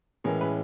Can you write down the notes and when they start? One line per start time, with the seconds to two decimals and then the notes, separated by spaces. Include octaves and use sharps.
0.24 A2 E3 G#3 C#4 A#4
0.41 B4